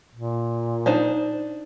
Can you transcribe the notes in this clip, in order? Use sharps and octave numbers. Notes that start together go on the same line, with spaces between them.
A#2
D4 D#4 C5